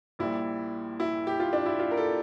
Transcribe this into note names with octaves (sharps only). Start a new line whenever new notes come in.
A#1 A#2 G3 E4
E4
G4
F4
D4
E4
F4
A#4
A4